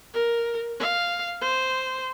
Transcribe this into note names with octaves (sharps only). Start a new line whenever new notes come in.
A#4
F5
C5